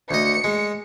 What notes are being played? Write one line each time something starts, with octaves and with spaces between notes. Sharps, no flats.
D2 D#5 C#7
G#3